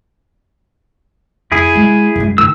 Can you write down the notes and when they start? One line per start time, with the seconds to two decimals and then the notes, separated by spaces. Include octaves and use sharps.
1.52 F2 E4 G#4
1.76 G#3
2.16 F#2 G#3
2.38 D3 D#3 E6